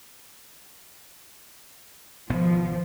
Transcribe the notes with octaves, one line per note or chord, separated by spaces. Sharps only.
G#1 B2 F3 B3